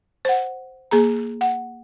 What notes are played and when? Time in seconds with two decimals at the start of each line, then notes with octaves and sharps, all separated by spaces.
0.25 C5 F#5
0.91 A#3 G#4 A#5
1.41 F#5